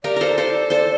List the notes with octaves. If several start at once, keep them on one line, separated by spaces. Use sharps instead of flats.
G4 A#4 D5
A4 A#4 C5
A4 C5
A4 C5